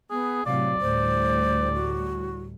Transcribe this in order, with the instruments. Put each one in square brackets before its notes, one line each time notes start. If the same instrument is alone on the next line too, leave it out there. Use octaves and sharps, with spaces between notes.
[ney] B3 [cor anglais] G#4
[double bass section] A2 C3 F#3 [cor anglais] D5 [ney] F5
[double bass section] D2 A2 G3 [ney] C5
[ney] F#4